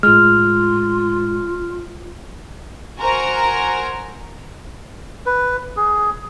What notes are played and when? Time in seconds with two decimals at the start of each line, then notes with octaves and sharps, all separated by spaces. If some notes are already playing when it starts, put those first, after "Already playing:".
0.03 A2 G#3 F4 F6
2.99 F#4 A#4 C5 G#5 A#5
5.26 B4
5.77 G#4